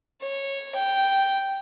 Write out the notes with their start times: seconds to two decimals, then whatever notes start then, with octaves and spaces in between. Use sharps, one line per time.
0.22 C#5
0.75 G5